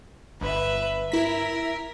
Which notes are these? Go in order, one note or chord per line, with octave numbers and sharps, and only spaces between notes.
G1 B4 E5
E4 A#4 B6